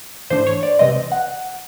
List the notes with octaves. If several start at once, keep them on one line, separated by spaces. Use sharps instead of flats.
G#2 E3 A3 D4 C5
C#5
D5
C#2 C3 E3 G3 C4 D#5
F#5